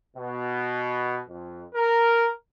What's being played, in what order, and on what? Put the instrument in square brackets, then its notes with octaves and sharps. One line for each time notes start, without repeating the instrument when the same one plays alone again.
[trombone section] B2
F2
A#4